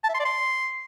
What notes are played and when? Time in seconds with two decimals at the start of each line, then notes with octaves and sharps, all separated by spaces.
0.04 A5
0.09 E5
0.14 C6
0.20 D5
0.25 C6